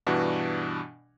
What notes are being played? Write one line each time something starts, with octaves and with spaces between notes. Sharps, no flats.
G2 B2 E3 D4 F#4